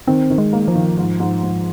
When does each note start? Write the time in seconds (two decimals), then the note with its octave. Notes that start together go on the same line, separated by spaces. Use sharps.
0.08 D#3 C4
0.30 D#3
0.38 G#3
0.53 A#3
0.68 F3
0.75 D#3
0.97 G#2
1.20 G#2
1.43 G#2